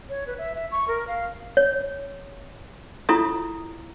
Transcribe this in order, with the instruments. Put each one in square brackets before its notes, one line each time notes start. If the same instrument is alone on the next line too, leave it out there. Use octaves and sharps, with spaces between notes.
[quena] C#5
B4
E5
E5
C#6
A#4
F5
[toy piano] C#5
E4 F4 A4 A#5 D#6